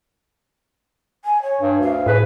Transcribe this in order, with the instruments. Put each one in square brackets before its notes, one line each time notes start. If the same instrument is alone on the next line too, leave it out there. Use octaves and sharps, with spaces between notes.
[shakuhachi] G#5
C#5
[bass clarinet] G2
[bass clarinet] D2 [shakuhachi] F5
[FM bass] A2 [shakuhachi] G#4 [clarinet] B4